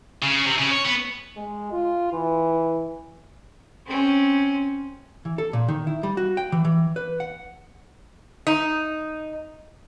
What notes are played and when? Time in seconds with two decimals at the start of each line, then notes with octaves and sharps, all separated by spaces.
0.23 C#3
0.46 C3
0.58 C#3
0.71 C#5
0.85 B3
1.36 G#3
1.72 F4
2.13 E3
3.86 C4 C#4
5.25 E3
5.38 A4
5.53 A#2
5.68 D#3
5.87 E4
6.03 G3
6.17 F#4
6.37 G5
6.52 E3
6.65 E3
6.96 B4
7.20 F#5
8.47 D#4